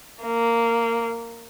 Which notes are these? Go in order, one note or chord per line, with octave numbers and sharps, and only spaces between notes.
A#3